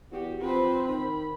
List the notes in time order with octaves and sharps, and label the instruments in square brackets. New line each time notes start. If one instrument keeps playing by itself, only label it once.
[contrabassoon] E2 [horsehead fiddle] F#4 G4
[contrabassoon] F3 [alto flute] C4 [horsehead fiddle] B4 C5
[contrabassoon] D#3 [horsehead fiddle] B5